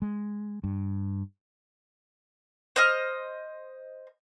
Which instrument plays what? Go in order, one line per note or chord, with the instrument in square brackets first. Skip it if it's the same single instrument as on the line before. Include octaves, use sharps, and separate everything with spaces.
[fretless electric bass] G#3
G2
[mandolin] C5 D#5 F6